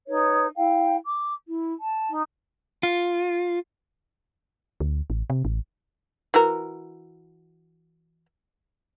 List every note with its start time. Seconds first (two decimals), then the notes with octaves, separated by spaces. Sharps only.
0.07 D#4 B4 C#5
0.56 E4 F5 G5
1.05 D6
1.44 E4
1.79 A5
2.09 D#4
2.83 F4
4.80 D2
5.10 A1
5.30 C3
5.45 A1
6.34 E3 F#4 A#4